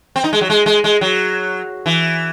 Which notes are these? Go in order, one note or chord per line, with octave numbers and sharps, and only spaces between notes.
C4
D#4
G#3
F#3
G#3
G#3
G#3
F#3
E3